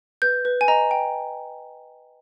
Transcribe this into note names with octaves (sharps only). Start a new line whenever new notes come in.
B4 G6
B4
G#5
D#5 A#5
G5